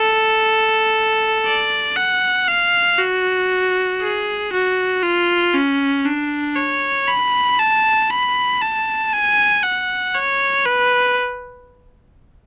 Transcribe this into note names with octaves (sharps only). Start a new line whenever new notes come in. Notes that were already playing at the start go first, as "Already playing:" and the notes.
Already playing: A4
D5
F#5
F5
F#4
G#4
F#4
F4
C#4
D4
C#5
B5
A5
B5
A5
G#5
F#5
C#5
B4